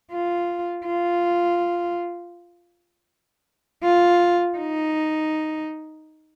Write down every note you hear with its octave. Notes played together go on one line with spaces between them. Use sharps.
F4
F4
F4
D#4